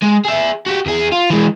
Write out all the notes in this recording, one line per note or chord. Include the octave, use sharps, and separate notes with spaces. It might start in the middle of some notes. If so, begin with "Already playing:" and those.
G#3
G#4 E5
F#4 G4
E2 G#4
F4
E3 G#3